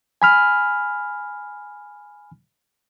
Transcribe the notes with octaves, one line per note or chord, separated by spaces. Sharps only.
G#5 B5 F6